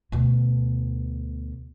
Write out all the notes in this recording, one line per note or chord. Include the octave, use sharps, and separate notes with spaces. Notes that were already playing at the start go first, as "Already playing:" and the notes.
D2 B2